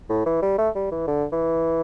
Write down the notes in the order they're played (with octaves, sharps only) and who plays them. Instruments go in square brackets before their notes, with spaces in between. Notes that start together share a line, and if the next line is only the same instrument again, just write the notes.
[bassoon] A2
E3
G3
A3
G3
E3
D3
E3